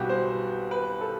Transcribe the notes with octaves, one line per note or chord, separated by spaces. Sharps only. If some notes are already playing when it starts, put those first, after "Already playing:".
Already playing: B1 B2 G3 F#4 G4
C5
B4
A4